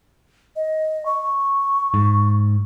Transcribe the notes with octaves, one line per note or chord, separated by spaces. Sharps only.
D#5
C#6
G#2